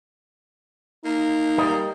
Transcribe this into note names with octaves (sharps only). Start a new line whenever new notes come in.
A#3 D#4
G3 A#4 D#5